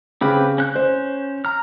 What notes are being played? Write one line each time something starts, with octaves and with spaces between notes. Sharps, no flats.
C#3 C4 G4 B4
C#4 F#6 G6
C5
A#5 F6